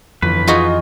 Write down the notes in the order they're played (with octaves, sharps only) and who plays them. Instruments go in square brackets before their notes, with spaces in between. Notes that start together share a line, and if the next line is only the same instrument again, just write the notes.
[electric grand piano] G1 [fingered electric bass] F2 E3 [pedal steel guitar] B4
[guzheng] D#4 F#4 G#4 [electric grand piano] F4 D#5